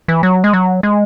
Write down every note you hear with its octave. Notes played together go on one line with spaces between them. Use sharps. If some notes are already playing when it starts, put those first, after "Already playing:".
E3
F#3
G#3
F#3
G#3